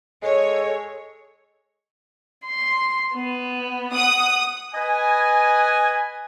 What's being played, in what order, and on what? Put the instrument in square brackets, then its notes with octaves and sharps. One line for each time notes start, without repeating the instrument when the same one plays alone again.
[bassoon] G#3 [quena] A4 [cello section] C#5
[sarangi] C6
B3
[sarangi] F#5 [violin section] D#6
[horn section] B4 D#5 G#5